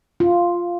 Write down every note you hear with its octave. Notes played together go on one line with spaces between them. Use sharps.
F4